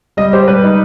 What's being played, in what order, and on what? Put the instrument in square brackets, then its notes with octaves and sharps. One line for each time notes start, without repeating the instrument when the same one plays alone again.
[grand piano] G3 [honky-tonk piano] D#5
[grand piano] G4 [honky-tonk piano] C5
[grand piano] G3 [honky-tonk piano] B4
[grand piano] D#4